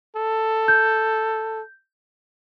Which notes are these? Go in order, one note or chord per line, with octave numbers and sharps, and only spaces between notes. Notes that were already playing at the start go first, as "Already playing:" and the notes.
A4
G6